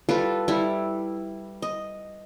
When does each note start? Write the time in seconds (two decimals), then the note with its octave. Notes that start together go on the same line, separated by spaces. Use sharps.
0.09 G3 F4 A4 B4
0.48 G3 E4
1.62 D#5